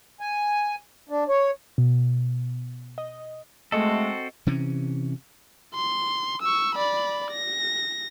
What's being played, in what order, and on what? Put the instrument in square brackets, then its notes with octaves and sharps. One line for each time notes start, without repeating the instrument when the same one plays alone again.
[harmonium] G#5
D4
C#5
[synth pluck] B2
D#5
[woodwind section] G#3 [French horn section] A3 [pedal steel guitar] C4 F#4 A4 [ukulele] D#5
[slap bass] C3 E3 C#4
[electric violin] C6
C#6 E6
D5 B5
A#6